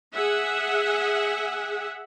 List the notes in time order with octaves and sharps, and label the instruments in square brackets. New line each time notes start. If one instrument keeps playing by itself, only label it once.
[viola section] G#4 E5 F#5